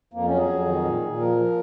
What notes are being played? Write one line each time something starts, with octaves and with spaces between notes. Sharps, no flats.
F2 A#3
F#3 C#4
G#4
F2
D#3
A#2
A#2
F3 A#4
F3